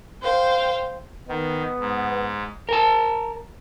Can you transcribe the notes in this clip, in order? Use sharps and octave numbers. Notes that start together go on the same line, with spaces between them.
C5 F5 G5
D#3 B3
G#2
A#4 A5